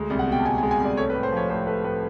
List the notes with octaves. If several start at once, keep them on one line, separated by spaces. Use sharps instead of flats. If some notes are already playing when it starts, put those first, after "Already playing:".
Already playing: D2 G#3
C2
F#5
B2 G5
A5
C2 G#5
G#5
G#3
G#5
C2
D5
A3 C#5
B4
A2
C5
F3 C#5
A2 C5
A3 B4
A2 B4